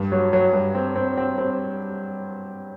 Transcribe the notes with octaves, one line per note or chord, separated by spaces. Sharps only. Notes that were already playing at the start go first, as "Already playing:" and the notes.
Already playing: G2
F#3
F#3
G2
C4
C4
C4
C4